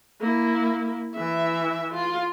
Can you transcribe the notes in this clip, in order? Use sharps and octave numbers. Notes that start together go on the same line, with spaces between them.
A#3 E4
E3 E5
F4